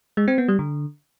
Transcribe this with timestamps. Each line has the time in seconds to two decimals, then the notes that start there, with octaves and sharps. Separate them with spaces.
0.17 G#3
0.28 C4
0.38 B3
0.48 G3
0.59 D3